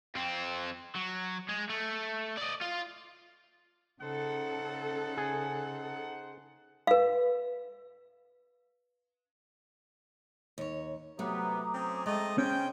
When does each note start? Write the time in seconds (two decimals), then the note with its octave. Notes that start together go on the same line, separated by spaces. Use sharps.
0.15 F2 C4
0.95 F#3
1.49 G#3
1.69 A3
2.38 D5 D#5
2.62 F4
4.01 C#3 D#4 A4 C5 F#5
5.17 G#4
6.87 B4 F5
10.58 D#2 C#5
11.19 C3 F#3 A3 B3 A#5 D6 D#6
11.74 C4 C#4
12.06 G#3 A3 C4 D#5
12.38 C#3 C#4 C5 G5